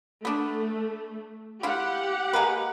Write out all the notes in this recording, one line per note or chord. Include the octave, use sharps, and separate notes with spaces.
A3 B3 D4
E4 F4 G4 F#5
G#3 A#3 B4